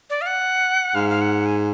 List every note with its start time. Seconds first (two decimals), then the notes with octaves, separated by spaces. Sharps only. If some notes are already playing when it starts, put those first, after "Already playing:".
0.10 D5
0.21 F5
0.27 F#5
0.95 G#2 F5
1.10 F5
1.21 F#5
1.46 G#5